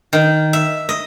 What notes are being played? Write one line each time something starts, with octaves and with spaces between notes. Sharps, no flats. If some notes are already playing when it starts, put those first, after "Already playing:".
D#3
E5
D#5